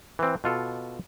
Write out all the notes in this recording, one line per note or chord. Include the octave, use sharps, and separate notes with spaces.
E3 C4
B2 F4 A4